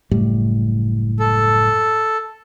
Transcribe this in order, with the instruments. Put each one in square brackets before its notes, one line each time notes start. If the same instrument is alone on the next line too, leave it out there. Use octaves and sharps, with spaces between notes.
[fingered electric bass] F#1 A2 G3
[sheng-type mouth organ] A4